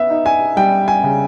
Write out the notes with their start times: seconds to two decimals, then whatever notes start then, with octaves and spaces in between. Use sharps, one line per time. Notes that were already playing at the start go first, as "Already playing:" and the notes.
Already playing: B3 E5
0.10 D#4
0.26 G#5
0.57 G3 G5
0.88 G#5
1.04 C#3